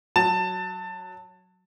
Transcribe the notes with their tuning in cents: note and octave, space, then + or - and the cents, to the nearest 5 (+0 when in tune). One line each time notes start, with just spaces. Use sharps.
F#3 +0 A5 +20